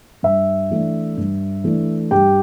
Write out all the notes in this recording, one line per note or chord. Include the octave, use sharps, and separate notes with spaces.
G2 E5
E3 A3 D4
G2
E3 A3 D4
G2 G4 G5